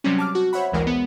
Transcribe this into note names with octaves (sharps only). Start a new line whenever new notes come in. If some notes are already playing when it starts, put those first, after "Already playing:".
C3 F#3 G3 C4 C#4
A5 D6 F6
F#4
C5 C#5 E5 F#5 B5
A1 D2 E3 G#3 A#4
B3